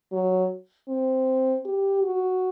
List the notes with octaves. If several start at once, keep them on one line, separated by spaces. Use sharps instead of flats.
F#3
C4
G4
F#4